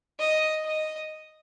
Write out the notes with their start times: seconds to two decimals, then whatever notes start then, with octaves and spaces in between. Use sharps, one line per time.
0.20 D#5
0.66 D#5